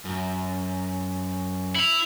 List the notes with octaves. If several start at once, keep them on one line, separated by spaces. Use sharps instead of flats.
F#2
E4 F7 F#7